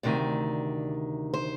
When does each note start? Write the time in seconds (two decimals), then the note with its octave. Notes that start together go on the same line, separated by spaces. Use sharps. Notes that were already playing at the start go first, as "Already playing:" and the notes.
0.03 D2 C3 D#3 D5
1.34 C5